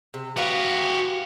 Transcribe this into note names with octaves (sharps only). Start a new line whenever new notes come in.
C3
F#4 G4 B4 E5 F5